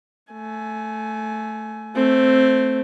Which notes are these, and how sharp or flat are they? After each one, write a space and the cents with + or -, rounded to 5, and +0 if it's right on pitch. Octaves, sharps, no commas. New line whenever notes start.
A3 +0 G#5 +20
A3 +0 C4 +0